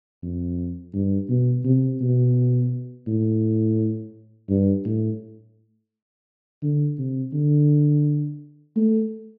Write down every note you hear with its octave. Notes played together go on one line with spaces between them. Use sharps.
F2
G2
B2
C3
B2
A2
G2
A2
D3
C3
D3
A3